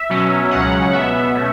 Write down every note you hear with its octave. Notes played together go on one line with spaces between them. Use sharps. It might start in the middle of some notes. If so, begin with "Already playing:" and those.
Already playing: E5
B2 F#3 C#4
C#2 C#3 F#3 C#4 F#5
B2 B3 E5
A3 C#4